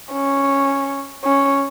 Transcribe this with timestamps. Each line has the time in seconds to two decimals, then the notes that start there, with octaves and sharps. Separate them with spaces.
0.12 C#4
1.24 C#4